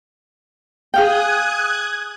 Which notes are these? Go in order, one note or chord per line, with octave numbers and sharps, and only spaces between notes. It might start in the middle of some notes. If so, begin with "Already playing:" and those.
G#4 F5 G5 D#6 F#6 G#6